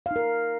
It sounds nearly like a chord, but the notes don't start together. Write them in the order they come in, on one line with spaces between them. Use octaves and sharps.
F5 D#4 A#4